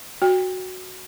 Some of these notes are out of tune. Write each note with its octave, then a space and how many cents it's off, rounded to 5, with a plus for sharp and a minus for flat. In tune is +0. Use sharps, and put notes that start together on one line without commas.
F#4 +0 G5 +25